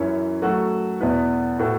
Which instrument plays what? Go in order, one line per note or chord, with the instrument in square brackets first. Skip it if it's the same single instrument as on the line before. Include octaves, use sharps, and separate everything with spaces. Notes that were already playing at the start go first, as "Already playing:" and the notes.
Already playing: [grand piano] F#2 E3 C#4 E4 C#5
F#3 A3 F#4
E2 B2 B3 E4 B4
A2 A3 F#4 B4